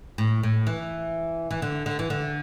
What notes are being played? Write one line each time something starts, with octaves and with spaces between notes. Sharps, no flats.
A2
A2
E3
E3
D3
D3
E3
D3